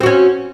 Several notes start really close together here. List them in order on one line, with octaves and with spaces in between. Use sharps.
C4 F#4 C#4